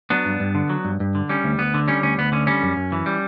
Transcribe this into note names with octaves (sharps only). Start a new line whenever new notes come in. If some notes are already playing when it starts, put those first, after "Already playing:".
F#3 B3 D4
G2
G2
D3
F#3
G2
G2
D3
G3 C#4
D2
D2 B3
D3
G3 C#4
D2 C#4
D2 B3
D3 C#4
G3 C#4
F#2
F#2
E3
G3